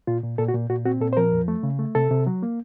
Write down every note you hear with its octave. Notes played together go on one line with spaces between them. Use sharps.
A#2 F4
A#2
A#2 A4
F#4
A#2
A#2 F#4
C4 F#4
A#2 A4
C5
F3 A#4
F2
A3
C#3
A3
C3 A4
C3
F#3
A#3